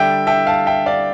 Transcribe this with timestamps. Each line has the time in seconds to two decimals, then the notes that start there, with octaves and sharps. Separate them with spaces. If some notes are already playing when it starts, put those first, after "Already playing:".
Already playing: D3 G3 D4 E5 G5
0.27 E5 G5
0.47 F5 A5
0.66 E5 G5
0.86 D5 F5